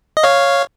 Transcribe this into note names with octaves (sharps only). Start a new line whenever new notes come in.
D#5
C#5 F5